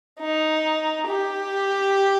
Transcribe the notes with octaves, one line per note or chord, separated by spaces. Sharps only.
D#4
G4